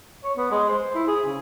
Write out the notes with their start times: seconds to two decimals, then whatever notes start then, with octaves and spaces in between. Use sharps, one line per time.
0.24 C#5
0.37 B3
0.51 G#3
0.69 C5
0.95 E4
1.08 G#4
1.26 C#3